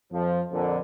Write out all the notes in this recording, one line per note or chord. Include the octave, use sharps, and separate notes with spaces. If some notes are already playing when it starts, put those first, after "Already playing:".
F2 F3
F2 A#2 D3